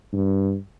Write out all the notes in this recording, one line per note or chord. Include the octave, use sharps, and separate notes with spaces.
G2